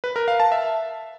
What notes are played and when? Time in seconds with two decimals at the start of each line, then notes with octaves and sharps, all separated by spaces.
0.04 B4
0.16 A#4
0.28 F5
0.40 A5
0.52 E5